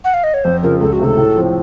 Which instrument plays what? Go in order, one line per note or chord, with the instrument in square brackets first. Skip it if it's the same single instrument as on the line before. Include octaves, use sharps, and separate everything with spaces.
[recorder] F#5
F5
D#5
C#5
[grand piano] F2 [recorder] C5
[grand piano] C#3 F3 [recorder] A#4
[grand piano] C#2 [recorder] A4
[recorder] F#4
[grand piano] C3 D#3 A3 [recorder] A4
[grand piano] A2
F3 C4